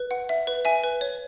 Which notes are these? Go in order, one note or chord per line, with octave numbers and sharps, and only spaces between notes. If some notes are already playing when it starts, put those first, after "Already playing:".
Already playing: B4
F#5
E5
B4
E5 G#5
B4
C#5